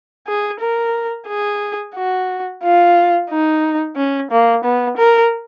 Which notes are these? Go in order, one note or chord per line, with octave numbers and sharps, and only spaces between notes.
G#4
A#4
G#4
F#4
F4
D#4
C#4
A#3
B3
A#4